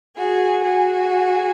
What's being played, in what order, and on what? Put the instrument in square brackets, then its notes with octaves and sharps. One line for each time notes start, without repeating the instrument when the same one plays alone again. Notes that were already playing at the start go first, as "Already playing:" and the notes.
[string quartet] F#4 G#4
F#4 G#4